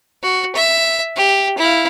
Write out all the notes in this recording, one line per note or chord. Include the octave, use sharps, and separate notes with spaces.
F#4
E5
G4
E4 F5